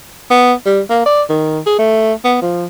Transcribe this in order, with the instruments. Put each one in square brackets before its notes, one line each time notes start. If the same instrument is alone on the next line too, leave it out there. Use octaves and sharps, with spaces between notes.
[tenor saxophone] B3
G3
A#3
D5
D#3
G#4
A3
B3
F3